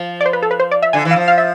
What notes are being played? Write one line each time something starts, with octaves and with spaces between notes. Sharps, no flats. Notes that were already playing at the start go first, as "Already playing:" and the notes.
Already playing: F3
D5
C5
B4
A4
B4
C5
D5
E5
D3 G#5
E3
F5
F3
F5
E5